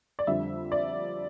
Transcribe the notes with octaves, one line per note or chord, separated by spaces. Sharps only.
D5
F2 D3 G3 E5
D5